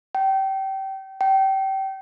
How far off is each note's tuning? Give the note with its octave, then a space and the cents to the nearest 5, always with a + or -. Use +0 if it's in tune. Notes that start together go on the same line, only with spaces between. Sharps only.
G5 -25
G5 -25